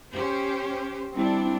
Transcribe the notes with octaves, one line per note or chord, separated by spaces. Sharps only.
C#4 G4 C5
G3 C4 D4 E4